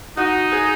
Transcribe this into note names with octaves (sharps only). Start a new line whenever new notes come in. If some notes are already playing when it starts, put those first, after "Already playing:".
D#4 F#4
G#4